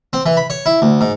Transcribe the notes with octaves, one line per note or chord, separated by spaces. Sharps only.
C4
E3
B5
C#5
E4
D2
G#2